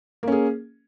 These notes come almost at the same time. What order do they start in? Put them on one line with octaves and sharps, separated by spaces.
A#3 C#4 G#4